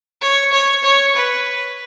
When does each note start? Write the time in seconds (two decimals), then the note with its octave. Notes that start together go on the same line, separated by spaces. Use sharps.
0.21 C#5
0.52 C#5
0.83 C#5
1.15 B4